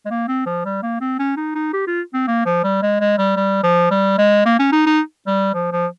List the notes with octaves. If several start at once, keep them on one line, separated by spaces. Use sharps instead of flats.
G#3
A#3
C4
F3
G3
A#3
C4
C#4
D#4
D#4
G4
F4
C4
A#3
F3
G3
G#3
G#3
G3
G3
F3
G3
G#3
A#3
C#4
D#4
D#4
G3
F3
F3